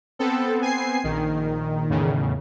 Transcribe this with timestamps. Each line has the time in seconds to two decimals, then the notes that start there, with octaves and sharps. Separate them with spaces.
0.19 B3 C4 A4
0.62 G#5 C7
1.04 A#1 D#3
1.90 E2 A2 C#3